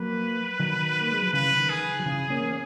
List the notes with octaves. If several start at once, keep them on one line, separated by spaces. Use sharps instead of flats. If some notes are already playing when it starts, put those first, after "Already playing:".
Already playing: F#3 A#3 B4
D#3 F#3
A#3
G#3
F#3
C#3 E3 B4
D#3
G#4
F#3
C#3 E3
A#3 C#4
C#4